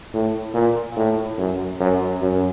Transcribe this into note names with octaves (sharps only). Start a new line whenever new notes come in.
A2
A#2
A2
F#2
F#2
F#2